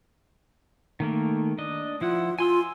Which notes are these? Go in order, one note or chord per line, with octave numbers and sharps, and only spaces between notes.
D#3 A3 A#3
D4 D#5
F3 E4 F4 F#5
F4 G#5 C6 E6